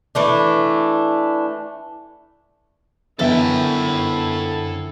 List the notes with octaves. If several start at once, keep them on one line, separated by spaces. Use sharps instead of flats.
E3 A3 D4
F#2 D3 B3 E4 A4 E5 G5